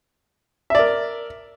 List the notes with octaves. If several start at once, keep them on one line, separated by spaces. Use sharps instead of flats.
A#4 D5 E5